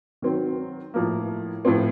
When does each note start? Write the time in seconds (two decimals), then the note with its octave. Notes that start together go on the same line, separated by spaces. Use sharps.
0.22 D#3 F#3 C4
0.94 A2 F3 A#3
1.65 A2 F3 C4